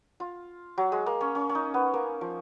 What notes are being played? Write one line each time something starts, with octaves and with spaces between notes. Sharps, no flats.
F4
F#3
G#3
A#3
C#4
C#4
C#4
D#4
B3
A#3
F3